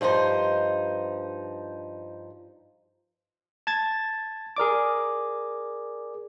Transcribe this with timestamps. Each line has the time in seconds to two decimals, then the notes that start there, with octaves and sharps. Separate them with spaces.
0.01 G2 F3 D#4 F4 C5
3.67 A5 G#6 A6
4.56 G#4 A#4 D5 D6